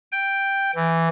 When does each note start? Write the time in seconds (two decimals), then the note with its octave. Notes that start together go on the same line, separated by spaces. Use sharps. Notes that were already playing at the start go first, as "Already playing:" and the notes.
0.12 G5
0.75 E3